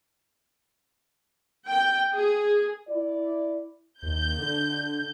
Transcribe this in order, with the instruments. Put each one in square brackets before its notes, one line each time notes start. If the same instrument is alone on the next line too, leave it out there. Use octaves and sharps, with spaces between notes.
[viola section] G5
G#4
[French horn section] E4 D5
[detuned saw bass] D#2 [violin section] G6
[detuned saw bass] D3